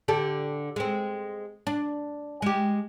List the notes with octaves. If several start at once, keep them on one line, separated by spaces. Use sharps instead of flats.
D3 G4 A4
G#3 C4
D4
G#3 G4